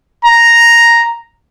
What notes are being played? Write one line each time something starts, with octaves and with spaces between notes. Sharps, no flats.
A#5